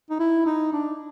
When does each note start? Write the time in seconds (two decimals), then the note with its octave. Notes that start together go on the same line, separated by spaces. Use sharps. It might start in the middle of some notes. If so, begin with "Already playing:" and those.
0.10 D#4
0.20 E4
0.46 D#4
0.73 D4